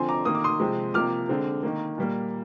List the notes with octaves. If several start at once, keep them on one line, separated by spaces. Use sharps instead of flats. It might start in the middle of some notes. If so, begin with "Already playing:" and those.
Already playing: D3 F3 C4 G#5 C6
A#5 D6
D#3 A#3 D#6
D6
C6 D#6
C3 F3 G#3 C4
C3 F3 A#3 D6 F6
D3 G#3 C4
D#3 A#3
A#2 G3 A#3